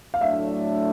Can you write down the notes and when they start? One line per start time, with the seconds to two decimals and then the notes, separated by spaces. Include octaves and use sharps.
0.14 F5
0.21 A2 F#3 A3 D4 E5